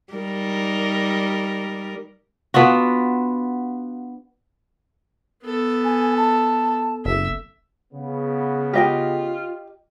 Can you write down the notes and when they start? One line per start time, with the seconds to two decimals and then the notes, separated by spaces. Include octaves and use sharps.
0.13 G3 D#4 A#4
2.54 B3 D4 F4 F#4
5.43 B3 A4
5.85 G#5
6.17 A5
7.05 F#1 E5
7.94 C#3 B3
8.74 F4 G4 D#5 G5